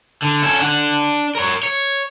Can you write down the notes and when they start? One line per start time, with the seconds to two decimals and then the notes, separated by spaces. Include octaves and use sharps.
0.22 D3
0.43 C#4 A4
0.60 D4 F#5
1.35 A#4 C#5
1.63 C#5